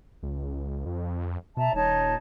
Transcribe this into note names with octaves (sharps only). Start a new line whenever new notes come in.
C#2
F2
B2 E5 A5 A#5
D#1 D#4 C#5 A5